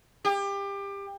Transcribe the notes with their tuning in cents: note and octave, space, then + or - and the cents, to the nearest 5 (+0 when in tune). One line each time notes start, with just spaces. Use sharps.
G4 +25